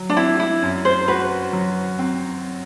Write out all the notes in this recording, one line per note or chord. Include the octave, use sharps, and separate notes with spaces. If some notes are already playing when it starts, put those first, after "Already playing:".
Already playing: F#3
D4
C4 E4
E4
F#2
C5
F#4 B4
F#3
C4